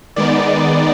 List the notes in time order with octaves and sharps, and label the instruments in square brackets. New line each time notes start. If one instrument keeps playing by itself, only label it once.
[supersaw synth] D#3 G#3 B3 D#4 D5